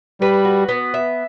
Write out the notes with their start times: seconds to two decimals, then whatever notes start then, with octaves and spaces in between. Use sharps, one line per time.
0.21 G3 B4
0.45 F#4
0.69 B3
0.94 E5